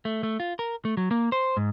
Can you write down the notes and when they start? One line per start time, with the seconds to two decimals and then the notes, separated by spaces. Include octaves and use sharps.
0.05 A3
0.23 A3
0.40 F4
0.59 A#4
0.85 A3
0.97 F#3
1.11 A#3
1.32 C5
1.57 G#2